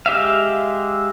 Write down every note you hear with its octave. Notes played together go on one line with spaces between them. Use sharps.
G#3 G4 E5 F5